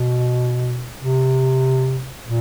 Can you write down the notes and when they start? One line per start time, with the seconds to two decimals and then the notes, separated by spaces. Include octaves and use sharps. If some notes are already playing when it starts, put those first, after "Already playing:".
Already playing: B2
1.01 C3
2.26 A#2